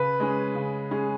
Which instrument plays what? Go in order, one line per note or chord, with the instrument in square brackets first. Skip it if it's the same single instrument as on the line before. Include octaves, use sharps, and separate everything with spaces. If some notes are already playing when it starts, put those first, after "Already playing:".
Already playing: [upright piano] C#3 [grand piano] B4
[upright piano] G#3 C#4 G#4
C#3
G#3 C#4 G#4